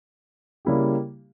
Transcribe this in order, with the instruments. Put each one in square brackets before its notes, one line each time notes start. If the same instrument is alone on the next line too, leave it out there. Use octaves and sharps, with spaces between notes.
[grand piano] C#3 G3 A#3 E4 G4